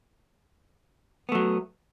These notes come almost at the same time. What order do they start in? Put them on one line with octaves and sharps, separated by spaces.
B3 A3 F#3